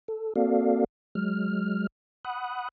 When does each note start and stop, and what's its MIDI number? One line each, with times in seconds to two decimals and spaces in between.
0.08 0.33 69
0.36 0.84 58
0.36 0.84 60
0.36 0.84 66
0.36 0.84 69
0.36 0.84 74
0.36 0.84 77
1.15 1.87 54
1.15 1.87 56
1.15 1.87 89
2.25 2.69 78
2.25 2.69 83
2.25 2.69 87
2.25 2.69 90